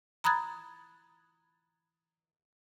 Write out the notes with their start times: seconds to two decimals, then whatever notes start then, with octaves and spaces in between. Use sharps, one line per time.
0.24 A#5 B5 D#6 F#6 G#6 A6